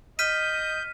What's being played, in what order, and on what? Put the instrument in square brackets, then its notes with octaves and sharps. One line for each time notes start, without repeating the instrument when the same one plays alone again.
[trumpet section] D#5 [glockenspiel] F6 B6 D#7 [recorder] G6